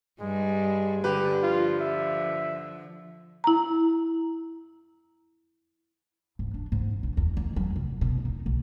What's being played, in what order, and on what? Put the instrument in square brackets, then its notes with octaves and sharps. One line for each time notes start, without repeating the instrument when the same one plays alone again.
[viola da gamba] G2 G3 [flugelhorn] G#3
[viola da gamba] D3 [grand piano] G4 B4
[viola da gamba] D3 F3 [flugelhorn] F4
[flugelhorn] E5
[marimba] E4 A#5
[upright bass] G#2
D4
G#2
A#1
E2
D#3
F#3
F1
B2
D#4
B1